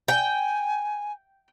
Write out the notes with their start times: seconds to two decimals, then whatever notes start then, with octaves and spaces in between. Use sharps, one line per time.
0.08 G5 G#5